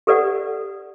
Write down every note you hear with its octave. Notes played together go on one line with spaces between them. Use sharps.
G4 A4 B4 D5 F#5